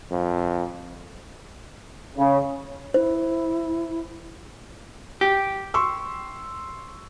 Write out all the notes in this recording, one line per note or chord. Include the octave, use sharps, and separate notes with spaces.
F2
C#3
E4 C5
G4
C6 C#6 E6